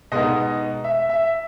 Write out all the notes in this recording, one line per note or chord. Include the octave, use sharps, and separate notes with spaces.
B2 G#3 B3 D#4 D#5
E5
E5